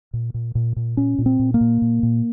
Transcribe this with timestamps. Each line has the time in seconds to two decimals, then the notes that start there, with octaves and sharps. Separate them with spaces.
0.13 A#2
0.34 A#2
0.55 A#2
0.76 A#2
0.97 A#2 C#4
1.19 A#2
1.26 C4
1.39 A#2
1.54 A#3
1.61 A#2
1.82 A#2
2.03 A#2